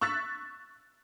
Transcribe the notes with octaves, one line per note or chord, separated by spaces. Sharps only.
C#6 E6 F#6 A6 B6